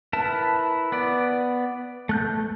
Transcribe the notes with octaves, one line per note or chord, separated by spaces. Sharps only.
E4 A#4 B4 A5
B3 B4 D5
A3 F#6 G6